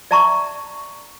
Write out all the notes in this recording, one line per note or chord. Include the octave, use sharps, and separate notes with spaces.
D5 E5 A5 A#5 C#6